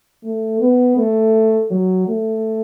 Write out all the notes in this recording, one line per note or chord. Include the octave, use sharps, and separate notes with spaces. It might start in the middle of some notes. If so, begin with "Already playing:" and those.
A3
B3
A3
F#3
A3